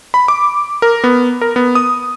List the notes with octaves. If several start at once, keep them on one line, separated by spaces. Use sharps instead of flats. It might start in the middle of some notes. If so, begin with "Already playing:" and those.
B5
D6
A#4
B3
A#4
B3
D#6